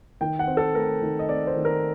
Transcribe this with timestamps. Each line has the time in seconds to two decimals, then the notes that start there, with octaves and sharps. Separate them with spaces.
0.21 D#3 G5
0.39 F#5
0.47 C4
0.57 A4
0.75 A3 A#4
1.01 D#3
1.19 D#5
1.29 C4 D5
1.47 C5
1.56 D#3
1.65 A#4